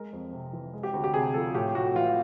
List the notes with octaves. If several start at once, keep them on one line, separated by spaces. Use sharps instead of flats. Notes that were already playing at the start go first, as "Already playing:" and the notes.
Already playing: G#3 A#4
F2
C3
E3
G#3
G4
D2 F#4
G4
C3 G#4
F3 A4
A2 G4
A2 F#4
E3 F4